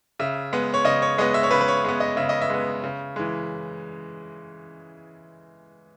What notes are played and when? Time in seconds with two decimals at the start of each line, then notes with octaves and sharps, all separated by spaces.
0.19 C#3 E5
0.53 G#3 B3
0.74 C#5
0.84 C#3 D#5
1.02 C#5
1.18 G#3 B3 D#5
1.34 E5
1.43 C#5
1.51 C#3 B4
1.61 B4
1.68 C#5
1.84 G#3 B3
2.00 D#5
2.17 C#3 E5
2.29 D#5
2.42 E5
2.50 G#3 B3
2.84 C#3
3.16 E3 G#3